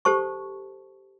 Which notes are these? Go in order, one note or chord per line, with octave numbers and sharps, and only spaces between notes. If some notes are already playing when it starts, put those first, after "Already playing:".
G4 A4 C5 A5 C#6